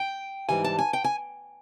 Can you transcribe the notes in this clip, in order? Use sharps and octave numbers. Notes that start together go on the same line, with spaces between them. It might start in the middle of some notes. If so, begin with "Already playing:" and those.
Already playing: G5
G#2 E3 G3 G#5
A5
G#5
G5
G#5